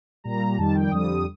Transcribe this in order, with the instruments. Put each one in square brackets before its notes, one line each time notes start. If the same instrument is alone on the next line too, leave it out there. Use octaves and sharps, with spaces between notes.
[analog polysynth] A#2 G3 A#5
F2 D#3 G3 A5
G5
F2 D3 G3 D#6